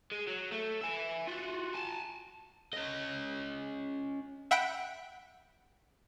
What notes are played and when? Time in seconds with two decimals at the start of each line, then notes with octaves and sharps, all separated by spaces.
0.12 G#3
0.28 F#3
0.52 A3
0.81 E5 G#5
1.27 F4 F#4
1.74 G#5 A5
2.73 C#4 D#5
4.51 E5 F#5 G5 B5 F#6 D7